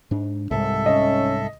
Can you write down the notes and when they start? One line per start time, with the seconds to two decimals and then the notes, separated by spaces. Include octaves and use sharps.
0.11 G#2 D4
0.51 C2 G#2 A4 E5
0.86 C#4 D#5